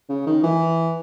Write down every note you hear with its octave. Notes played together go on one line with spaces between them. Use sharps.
C#3
D#3
E3